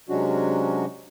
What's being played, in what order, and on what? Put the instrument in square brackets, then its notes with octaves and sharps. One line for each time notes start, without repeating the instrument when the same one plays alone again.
[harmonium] C3 F#3 G#3 C#4 D4 F#4